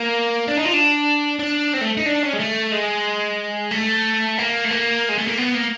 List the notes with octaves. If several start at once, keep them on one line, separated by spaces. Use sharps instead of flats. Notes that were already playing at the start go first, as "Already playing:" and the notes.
Already playing: A#3
D4
D#4
F4
D4
D4
C4
A3
D#4
D4
C#4
G#3
A3
G#3
A3
A#3
A3
A#3
G#3
A3
A#3
B3
A#3